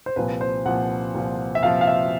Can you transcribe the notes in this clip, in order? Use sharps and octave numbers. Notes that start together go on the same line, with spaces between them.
C5
C2 A#2 F3 B4
C5
C2 A#2 F3 F#5
C2 A#2 F3
E5
C2 A#2 F3 F5
F5
E5